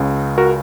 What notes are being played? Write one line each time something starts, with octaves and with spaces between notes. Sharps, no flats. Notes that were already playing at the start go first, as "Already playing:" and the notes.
Already playing: C#2 C#3
F#4 A#4